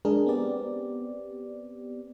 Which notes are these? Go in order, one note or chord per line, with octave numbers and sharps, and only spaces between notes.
G#3 D4 G#4 A#4
B3 C4 G4 D5